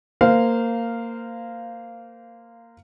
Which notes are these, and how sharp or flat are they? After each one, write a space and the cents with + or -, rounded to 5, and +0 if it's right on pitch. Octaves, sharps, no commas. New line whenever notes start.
A#3 -15 C5 -25 F5 -5